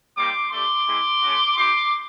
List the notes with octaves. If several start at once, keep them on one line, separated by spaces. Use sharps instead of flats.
G3 A#3 D#4 G4 C6 D6
A3 D4 G4 C6 D6
G#3 C4 E4
A3 C#4 F#4
C4 E4 G4 C6 D6